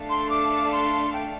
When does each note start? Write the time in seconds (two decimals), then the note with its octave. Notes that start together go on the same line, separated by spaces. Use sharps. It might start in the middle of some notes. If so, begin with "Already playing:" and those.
Already playing: A3 D4 A4 F5
0.10 C6
0.30 D6
0.72 C6
1.13 G5